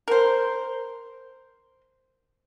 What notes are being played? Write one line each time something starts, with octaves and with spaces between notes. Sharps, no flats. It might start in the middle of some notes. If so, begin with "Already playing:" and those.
A#4 C5